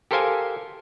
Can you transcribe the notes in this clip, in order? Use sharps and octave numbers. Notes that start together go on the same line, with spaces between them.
G4 A4 A#4 C5 F5 G#5